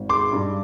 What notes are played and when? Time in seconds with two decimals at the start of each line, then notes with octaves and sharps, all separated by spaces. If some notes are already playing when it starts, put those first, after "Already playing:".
Already playing: G#1
0.09 G#3 C6 D6
0.32 G2